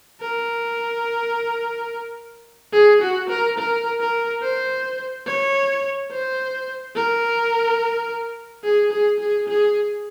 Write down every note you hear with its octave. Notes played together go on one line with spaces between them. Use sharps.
A#4
G#4
F#4
A#4
A#4
A#4
C5
C#5
C5
A#4
G#4
G#4
G#4
G#4